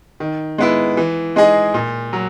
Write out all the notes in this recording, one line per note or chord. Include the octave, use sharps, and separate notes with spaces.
D#3
G#3 B3 E4
E3
G#3 D#4 G#4 D#5
A#2
F#3